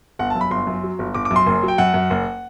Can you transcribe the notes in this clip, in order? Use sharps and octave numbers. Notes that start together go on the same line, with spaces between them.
G1 F#5
A5
F#2
B5
G1 C6
F#2
F#3
G1
G1 D6
D6
F#2
C6
F#1
F#3
G5
F#2 F#5
F#2
F#1